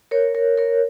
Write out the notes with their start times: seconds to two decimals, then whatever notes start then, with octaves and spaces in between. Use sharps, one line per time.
0.11 A#4 C#5
0.35 A#4 C#5
0.58 A#4 C#5